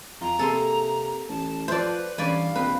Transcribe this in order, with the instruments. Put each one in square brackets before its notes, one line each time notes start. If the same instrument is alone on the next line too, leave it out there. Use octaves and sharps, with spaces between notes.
[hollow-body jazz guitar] F2 F4 [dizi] A#5
[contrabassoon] C3 [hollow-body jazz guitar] A#3 G#4 [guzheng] A4 G#5 C6
[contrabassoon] A1 [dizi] A5
[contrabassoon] F3 [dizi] B4 [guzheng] C5 D5 [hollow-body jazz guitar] E5 A5
[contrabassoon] G2 [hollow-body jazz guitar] E3 C#4 [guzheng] D5 G#5 B5 [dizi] F5
[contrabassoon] A#1 [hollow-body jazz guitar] D#3 C4 [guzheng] B4